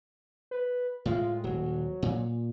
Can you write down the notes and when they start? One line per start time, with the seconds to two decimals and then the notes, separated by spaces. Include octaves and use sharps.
0.51 B4
1.06 A2 G#3 F4
1.44 D#1 F#3
2.02 A#2